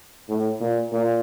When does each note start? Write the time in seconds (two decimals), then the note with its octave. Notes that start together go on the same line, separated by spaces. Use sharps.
0.29 A2
0.60 A#2
0.92 A#2